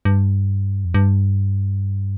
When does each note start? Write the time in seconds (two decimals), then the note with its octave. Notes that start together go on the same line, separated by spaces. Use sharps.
0.05 G2
0.85 F2
0.94 G2